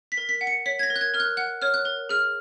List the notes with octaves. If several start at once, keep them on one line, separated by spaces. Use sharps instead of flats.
B6
A#4
B6
F#5
C#7
C#5 B6
G#6
A#6
A#4
F#6
G#6
A#4 F6
F#6
F#5 F#6
C#5 F6
F#6
A#4
G#4 F6